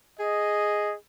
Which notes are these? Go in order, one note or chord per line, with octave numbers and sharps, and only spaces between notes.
G#4 D#5